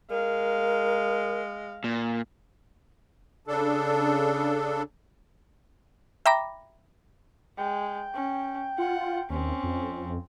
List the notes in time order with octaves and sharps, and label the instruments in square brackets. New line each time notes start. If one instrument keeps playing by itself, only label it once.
[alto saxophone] G#3 [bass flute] A#4 [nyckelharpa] F5
[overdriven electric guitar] A#2
[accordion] C#3 D4 A4
[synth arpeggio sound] E5 G5 A#5 B5 D6 A#6
[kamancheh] G#3 [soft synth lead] G5
[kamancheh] C#4
[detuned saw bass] F4 [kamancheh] F#5
[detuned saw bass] D#2 [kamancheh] C4 C#4
[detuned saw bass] F2